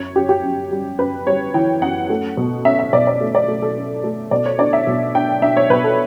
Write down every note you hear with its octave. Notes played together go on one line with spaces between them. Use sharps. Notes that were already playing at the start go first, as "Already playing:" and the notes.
Already playing: F#2 C#5
F#2 G4
G4
F#2
G3
F#2 B4
G3 C#5
E3 G5
F#2 F#5
A3
B2
C#4 E5
E5
B2 D5
D5
A3
D5
A3
A4
C#4
A3
B2 D5
C#5
D4 D5
E5
B2
D4 G5
D4 E5
C#5
B2 B4
A4